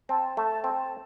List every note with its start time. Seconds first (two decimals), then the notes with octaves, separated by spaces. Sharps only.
0.09 C4 A5
0.37 A3 A5
0.64 C4 A5